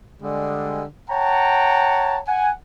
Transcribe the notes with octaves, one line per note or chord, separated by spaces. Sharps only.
D3 G3 G#3
C#5 F#5 G5 A5 A#5
F#5 G#5